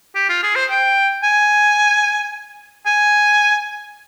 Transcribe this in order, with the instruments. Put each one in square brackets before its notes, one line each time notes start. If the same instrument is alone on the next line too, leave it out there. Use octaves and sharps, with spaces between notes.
[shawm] G4
F4
G#4
C5
G5
G#5
G#5